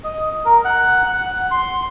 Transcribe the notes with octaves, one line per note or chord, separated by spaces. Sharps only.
D#5
A#4
F#5
F#5
F#5
C6